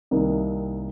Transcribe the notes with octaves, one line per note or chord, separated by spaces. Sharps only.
C2 C3 D#3 A#3 D#4